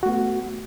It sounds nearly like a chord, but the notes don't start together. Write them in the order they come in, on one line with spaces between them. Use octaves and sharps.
F#4 A3 B3